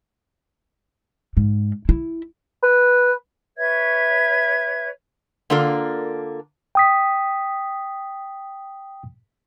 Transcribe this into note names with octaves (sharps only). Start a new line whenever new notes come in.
G#2
E4
B4
B4 C#5 E5 G#6
D3 A#3 D4 F4 A4 A#4
G5 D#6 B6